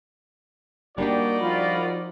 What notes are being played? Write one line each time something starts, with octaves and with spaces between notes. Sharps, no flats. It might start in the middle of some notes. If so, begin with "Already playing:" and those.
G3 A#3 D4 D#4 F#4 G4 D5
F3 F4 A#4 B5